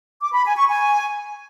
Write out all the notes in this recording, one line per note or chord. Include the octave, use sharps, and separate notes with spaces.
D6
B5
G#5
C#6
G#5